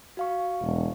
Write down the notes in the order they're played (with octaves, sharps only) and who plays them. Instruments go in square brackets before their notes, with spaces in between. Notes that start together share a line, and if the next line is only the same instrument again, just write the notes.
[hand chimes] F#4 F5 C#6
[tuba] E1